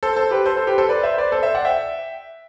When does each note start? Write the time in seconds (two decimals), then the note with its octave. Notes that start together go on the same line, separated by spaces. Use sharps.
0.03 A4 C5
0.16 A4 C5
0.31 G4 B4
0.46 A4 C5
0.57 A4 C5
0.67 G4 B4
0.78 A4 C5
0.89 B4 D5
1.03 C5 E5
1.18 B4 D5
1.32 A4 C5
1.43 C5 E5
1.55 D5 F#5
1.65 E5 G5